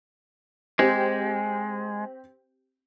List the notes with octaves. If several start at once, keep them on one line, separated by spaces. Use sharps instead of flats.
G#3 C4 G4